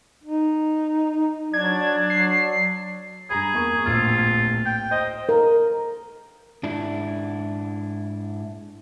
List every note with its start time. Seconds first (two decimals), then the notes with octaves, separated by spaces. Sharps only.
0.24 D#4
1.54 F#3 D4 G#6
2.10 F#3 C7
3.30 G2 G#4 A#5 B5
3.54 E2 A#3 C#6
3.86 D1 A#1 F4 E6
4.66 G5
4.91 C5 D#5
5.29 A#4
6.63 G#2 D4 E4